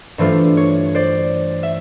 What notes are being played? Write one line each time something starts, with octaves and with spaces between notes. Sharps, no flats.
G2 E3 A3 D4 F4 C5
C#5
C5 D5
E5